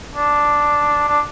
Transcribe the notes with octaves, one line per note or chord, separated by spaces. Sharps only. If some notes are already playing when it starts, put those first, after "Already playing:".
D4
D4